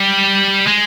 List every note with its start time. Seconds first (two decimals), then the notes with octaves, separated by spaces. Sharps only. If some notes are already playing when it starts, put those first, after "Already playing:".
Already playing: G3
0.67 G#3